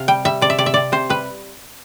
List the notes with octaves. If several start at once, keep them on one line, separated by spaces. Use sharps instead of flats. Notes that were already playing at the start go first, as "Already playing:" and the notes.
Already playing: C3 F5
G3 G5
G3 E5
C3 D5
E5
C3 D5
E5
C3 D5
C3 C5
G3 B4